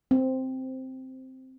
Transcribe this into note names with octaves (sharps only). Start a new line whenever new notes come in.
C4